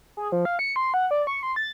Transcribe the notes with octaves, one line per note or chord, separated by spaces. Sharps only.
G#4
F3
F5
C#7
C6
F#5
D5
C#6
C6
A6